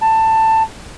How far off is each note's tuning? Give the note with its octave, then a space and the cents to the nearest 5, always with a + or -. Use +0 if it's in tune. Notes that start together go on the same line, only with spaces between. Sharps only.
A5 +15